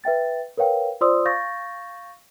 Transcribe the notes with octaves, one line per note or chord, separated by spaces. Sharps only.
B4 E5 G5 A6
A#4 B4 C#5 F5 G5
F4 C5 D5 C6 D#6 E6
F5 C#6 G6 A6 A#6